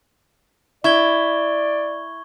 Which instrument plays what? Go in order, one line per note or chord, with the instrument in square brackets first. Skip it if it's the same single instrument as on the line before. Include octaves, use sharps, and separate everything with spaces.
[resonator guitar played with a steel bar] E4 [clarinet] D5 [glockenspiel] C#6 G#6 G7